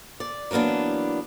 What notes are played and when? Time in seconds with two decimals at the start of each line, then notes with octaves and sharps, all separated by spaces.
0.20 D5
0.51 E3 F#3 A#3 B3 D4